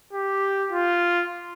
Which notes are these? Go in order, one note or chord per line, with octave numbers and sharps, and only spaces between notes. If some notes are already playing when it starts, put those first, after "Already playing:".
G4
F4